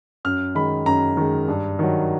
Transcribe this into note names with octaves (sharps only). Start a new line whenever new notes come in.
F#2 F6
D#3 G#3 B5
F#2 A#5
D#3 G#3
G2
D#3 F#3